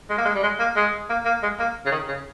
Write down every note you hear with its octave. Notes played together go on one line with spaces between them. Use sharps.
G#3
A#3
G#3
G3
G#3
A#3
G#3
A#3
A#3
G#3
A#3
C#3
D#3
C#3